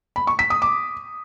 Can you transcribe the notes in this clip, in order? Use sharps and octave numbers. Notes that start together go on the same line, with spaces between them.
B5
C#6
B6
D#6
D6